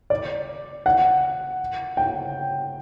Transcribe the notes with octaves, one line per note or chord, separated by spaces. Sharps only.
D5
F#5
G5